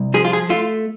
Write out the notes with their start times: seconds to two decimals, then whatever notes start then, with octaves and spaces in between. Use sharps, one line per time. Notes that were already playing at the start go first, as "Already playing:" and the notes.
Already playing: C2
0.14 F3 G#4
0.25 F4
0.33 G#4
0.49 A3 F4